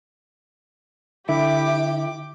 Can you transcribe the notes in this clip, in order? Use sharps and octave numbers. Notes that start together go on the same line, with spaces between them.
D3 E4 G4 D6